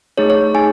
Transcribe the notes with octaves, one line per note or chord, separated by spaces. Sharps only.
A3 D#4 G#4 C#5
C#5
A3 D#4 G#4 G#5